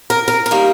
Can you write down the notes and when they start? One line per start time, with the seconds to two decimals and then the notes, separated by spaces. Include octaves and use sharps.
0.10 A#4
0.28 A#4
0.46 A#4
0.51 D#3 G3 A#3